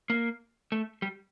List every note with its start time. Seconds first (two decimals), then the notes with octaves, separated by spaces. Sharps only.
0.10 A#3
0.72 A3
1.02 G3